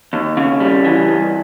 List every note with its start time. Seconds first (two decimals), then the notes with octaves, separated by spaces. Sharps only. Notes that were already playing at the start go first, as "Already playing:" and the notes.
0.13 D#2
0.37 C#3
0.60 G3
0.85 E3
1.08 G2